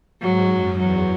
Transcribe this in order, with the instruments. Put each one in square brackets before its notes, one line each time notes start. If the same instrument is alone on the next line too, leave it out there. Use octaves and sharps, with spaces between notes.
[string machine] G#2 [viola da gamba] F#3
[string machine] F#2
[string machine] E2 [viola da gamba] F#3